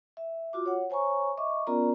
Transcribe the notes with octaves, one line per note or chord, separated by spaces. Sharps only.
E5
F4 F#4 D6
C#5 F#5
C5 C#5 G#5 A#5 C#6
D#5 E5 C#6 D6
B3 C#4 F4 A#4 D5 A#5